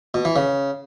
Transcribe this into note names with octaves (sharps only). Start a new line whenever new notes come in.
B2
E3
C#3